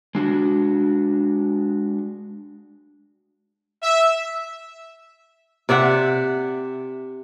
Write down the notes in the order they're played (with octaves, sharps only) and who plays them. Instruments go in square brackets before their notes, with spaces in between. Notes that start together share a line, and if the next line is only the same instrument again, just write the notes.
[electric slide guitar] G#3 D4 F#4
[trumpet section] E5
[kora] C3 D5 E5 F#5